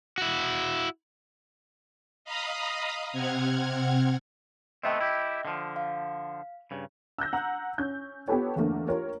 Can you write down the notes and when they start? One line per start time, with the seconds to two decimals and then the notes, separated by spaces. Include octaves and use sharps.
0.18 E4 F#4
2.25 D#5 F5 A#5 B5 D#6
3.13 C3 C4 F#5 F6 G#6
4.84 A3 B3 C4 D#5 E5 G5
5.01 E4 G4
5.45 D3 F3
5.76 F5
6.71 G2 C#3
7.18 E6 F#6 G6 A#6
7.33 F#5 A#5 E6
7.78 C#4 G6
8.28 B3 F4 G4 A4 B4 C#5
8.56 E2 D3 A3 A#3
8.88 F4 G4 A#4 C#5